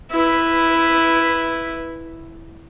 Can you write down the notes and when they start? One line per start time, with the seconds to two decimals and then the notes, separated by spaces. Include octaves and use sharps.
0.12 E4 B4